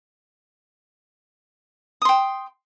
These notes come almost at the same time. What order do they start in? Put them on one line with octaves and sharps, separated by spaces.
D#6 C6 G5